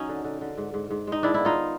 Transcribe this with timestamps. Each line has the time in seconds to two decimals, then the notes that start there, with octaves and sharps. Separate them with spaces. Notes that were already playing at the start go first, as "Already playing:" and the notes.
Already playing: F#3 C#4 D#4
0.09 D3
0.25 D3
0.41 D3
0.57 G#2
0.74 G#2
0.90 G#2
1.07 G#3 D#4
1.23 D#3 D4 E4
1.34 E4
1.40 B3
1.45 D#4 F4